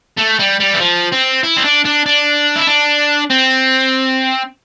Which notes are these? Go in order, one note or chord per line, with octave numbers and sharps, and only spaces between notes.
A3
G3
G3
E3
F3
C4
E4
C4
D4
D4
D4
E4
D4
C4